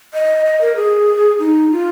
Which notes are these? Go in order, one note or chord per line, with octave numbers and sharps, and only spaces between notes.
D#5
D#5
A#4
G#4
D#4
F4